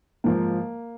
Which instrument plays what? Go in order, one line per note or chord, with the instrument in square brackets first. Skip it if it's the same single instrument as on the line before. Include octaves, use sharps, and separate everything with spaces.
[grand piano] G#2 F3 A#3